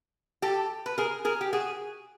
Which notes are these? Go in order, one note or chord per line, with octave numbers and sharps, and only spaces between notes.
G4 A4
B4
G#4 A#4
G#4 A#4
G4
F#4 G#4